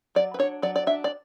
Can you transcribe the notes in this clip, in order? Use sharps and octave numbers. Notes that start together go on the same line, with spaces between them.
F#3 D5
B4
D4 C#5
F#3 D5
D5
D4 E5
D5